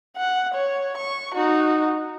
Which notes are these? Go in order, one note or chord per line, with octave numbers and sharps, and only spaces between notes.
F#5
C#5
C#6
D#4 F#4